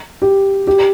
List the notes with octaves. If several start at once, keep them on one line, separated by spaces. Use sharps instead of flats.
G4
G4